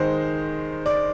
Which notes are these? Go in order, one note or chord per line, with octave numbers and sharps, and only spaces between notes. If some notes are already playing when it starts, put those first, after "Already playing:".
Already playing: D#3 G#3 D#4 C5
D5